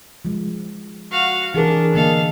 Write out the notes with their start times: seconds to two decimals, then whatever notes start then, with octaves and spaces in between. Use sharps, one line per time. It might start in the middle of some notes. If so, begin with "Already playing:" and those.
0.25 F3 G#3
1.11 F#4 F5
1.54 E3 D4 G#4 A#4
1.94 D3 A#3 A4 D#5 F5